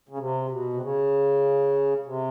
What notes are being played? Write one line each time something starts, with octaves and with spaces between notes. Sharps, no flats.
C#3
C3
B2
C3
C#3
C3